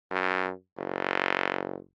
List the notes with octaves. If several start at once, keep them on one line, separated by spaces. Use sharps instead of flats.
F#2
F#1